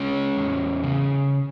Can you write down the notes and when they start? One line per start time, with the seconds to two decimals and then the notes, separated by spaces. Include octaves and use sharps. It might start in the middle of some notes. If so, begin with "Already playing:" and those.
Already playing: G#3 C#4
0.37 E2
0.84 C#3